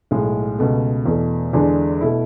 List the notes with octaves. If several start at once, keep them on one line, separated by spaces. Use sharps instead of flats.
B1 A2 G#3
C#2 B2 A3
E2 B2 A3
E2 D3 G#3 D4
B2 A3 E4